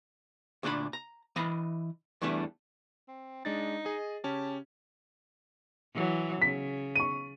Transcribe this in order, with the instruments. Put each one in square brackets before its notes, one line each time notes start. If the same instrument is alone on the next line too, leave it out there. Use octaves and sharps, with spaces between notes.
[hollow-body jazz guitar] D2 A#2 D4 F4 B5
A#5
E3 D#5 A#5 B5
E2 E3 G3 A3 D4
[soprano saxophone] C4
[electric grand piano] G#3 D4 A6 [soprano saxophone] D#4
[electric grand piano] G#4 D#5
[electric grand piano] C#3 C#4 G4 [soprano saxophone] A5
[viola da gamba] E3 F#3
[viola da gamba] C#3 [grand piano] B6
[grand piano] C#6 D#7